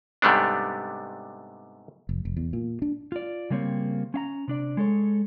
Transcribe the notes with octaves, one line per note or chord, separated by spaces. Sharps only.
G#2 C3 G3 A3 B3 D4
F1
F1
E2
A#2
D4
F4 D5
C#3 G3 A#3 C4 C#5
C#4 F5 A#5
C3 D4 D5
G#3 A4 C#5